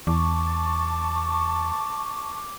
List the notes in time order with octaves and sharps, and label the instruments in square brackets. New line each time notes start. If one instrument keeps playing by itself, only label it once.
[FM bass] E2 [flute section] A5 C#6 [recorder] D6